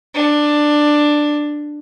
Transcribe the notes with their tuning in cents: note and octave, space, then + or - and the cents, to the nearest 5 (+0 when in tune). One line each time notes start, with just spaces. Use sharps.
D4 +10